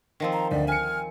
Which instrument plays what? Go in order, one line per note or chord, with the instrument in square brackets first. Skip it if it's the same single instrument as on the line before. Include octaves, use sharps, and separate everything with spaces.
[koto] D#3 F3 C4
[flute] A#5
[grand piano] D2 [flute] D5
[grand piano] G#5 C#7 [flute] F6